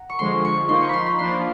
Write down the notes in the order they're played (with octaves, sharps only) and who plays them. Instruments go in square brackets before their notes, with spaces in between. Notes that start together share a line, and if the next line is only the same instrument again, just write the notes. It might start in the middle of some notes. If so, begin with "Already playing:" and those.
Already playing: [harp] F#5 A#5
C#6
[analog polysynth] D3 F3 G#3 [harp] C6
[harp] C#6
[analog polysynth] F3 A#3 D#4 [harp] C6
[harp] C#6
B5 C6
B5
[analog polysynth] F3 A#3 D4 [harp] C6